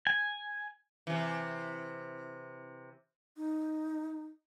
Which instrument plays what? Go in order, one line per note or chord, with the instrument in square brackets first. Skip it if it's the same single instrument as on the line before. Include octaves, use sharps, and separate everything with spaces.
[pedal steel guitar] G#5
[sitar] C3 E3
[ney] D#4